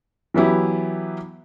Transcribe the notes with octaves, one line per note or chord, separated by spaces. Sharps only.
E3 F#3 B3 E4 G4